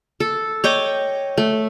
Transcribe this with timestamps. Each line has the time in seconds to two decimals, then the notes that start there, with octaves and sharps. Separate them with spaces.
0.20 A4
0.64 C#5 D#5 G5 D6
1.38 A3